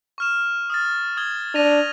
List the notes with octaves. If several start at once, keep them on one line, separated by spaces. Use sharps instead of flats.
C#6 F6 E7
D#6 F6 A6
D#6 G#6 G7
D4 A#6 D#7 F7